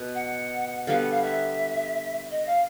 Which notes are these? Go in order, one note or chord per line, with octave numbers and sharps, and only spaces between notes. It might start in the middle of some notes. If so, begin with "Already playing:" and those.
Already playing: B2
F#5
D3 G3 B3 F5
F#5
F5
E5
D#5
F5